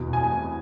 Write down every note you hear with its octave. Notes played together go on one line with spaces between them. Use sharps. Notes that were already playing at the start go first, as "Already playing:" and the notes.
Already playing: E2 B2
G#5